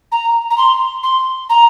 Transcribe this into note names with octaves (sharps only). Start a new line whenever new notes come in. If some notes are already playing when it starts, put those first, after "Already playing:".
A#5
A#5
C6
C6
A#5